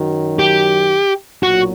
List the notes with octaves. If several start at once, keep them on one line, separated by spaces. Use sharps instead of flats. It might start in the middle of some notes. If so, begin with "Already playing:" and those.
Already playing: F#2 D#3 F#3
G4
B1 A#2 F#3 F#4